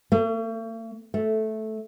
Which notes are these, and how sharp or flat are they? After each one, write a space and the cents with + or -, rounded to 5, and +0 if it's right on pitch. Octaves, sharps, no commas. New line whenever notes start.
A3 +45
A3 -10